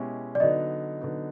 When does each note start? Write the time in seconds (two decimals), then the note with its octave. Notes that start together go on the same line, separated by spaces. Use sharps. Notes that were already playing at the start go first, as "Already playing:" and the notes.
Already playing: B2 G#3 C#4 E4 G4
0.35 D5
0.40 D3 F#3 B3 D#4 D#5
1.01 D3 F#3 B3 D#4